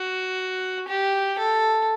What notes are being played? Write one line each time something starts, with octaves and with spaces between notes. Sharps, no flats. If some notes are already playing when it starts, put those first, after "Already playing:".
Already playing: F#4
G4
A4